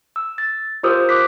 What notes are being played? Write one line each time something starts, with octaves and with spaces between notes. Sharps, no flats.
E6
A6
F4 G4 A#4 C5 D#6 E6
D6 F#6 B6